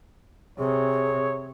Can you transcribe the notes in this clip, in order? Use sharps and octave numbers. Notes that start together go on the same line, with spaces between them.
C3 G#4 C#5